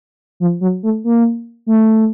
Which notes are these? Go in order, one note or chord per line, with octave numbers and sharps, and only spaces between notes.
F3
F#3
A3
A#3
A3